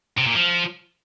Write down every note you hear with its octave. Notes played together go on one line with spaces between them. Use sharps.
C3
A#2
F3